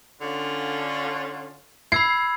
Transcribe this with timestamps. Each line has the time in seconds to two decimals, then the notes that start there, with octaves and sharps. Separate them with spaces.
0.21 D3 C#4 F4
1.92 B5 E6 G#6 C7